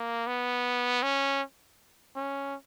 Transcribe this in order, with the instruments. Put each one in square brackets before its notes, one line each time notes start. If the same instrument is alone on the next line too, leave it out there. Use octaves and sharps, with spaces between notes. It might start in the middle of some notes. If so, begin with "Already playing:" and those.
Already playing: [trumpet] A#3
B3
C#4
C#4